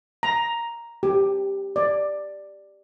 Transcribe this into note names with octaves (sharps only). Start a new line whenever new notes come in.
A#5
G4
D5